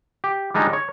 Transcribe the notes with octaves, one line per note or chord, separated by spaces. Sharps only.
G4
G3 G#3 D4 D#4 F4
C#5